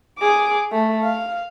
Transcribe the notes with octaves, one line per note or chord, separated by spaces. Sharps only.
G#4 D6
A3
F5